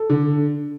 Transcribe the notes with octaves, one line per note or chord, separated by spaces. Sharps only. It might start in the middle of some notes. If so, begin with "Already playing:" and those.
Already playing: A4
D3